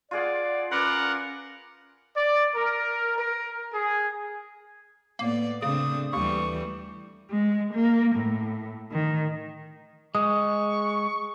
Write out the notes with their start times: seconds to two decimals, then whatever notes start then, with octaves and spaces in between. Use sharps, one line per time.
0.11 F4 G#4 D5 F#5
0.71 C#4 A#4 B4 D5 F#5
2.16 D5
2.55 A#4
3.19 A#4
3.73 G#4
5.19 A2 A#3 B3 D5
5.62 C#3 A3 C4 D4 D#6
6.13 D#2 E3 G3 A3 C#6
7.29 G#3
7.72 A#3
8.14 A2
8.91 D#3
10.15 G#3 C#6 D#6